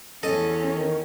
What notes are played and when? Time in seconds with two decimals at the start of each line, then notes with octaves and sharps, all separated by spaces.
0.23 E2 C#4 A4 D#5
0.73 D#3